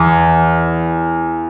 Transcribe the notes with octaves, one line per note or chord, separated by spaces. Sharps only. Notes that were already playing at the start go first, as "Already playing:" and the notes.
Already playing: E2